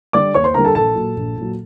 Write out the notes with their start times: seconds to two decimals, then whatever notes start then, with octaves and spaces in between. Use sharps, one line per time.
0.13 D3 G3 D5 D6
0.34 D#2 C#5 C#6
0.44 C5 C6
0.54 D3 G3 A#4 A#5
0.65 A4 A5
0.75 A#1 A4 A5
0.95 A#2 F#3
1.17 A#1
1.36 A#2
1.42 F#3